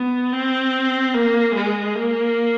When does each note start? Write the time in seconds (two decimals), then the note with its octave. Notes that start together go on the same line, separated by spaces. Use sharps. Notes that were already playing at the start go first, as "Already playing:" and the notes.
Already playing: B3
0.33 C4
1.14 A#3
1.55 G#3
1.95 A#3